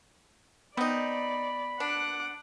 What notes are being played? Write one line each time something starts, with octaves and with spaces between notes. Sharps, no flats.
B3 C4 D#4 D5 B5
D4 F#5 D6